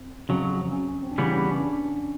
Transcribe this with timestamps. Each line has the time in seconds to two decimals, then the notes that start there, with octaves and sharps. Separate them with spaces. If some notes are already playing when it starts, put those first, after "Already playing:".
Already playing: C4
0.29 F2 C#3 F#3
0.73 C#4
0.88 C#4
1.03 C4
1.12 D4
1.18 C#3 E3 G3 B3 C#4
1.32 C#4
1.48 D4
1.62 D4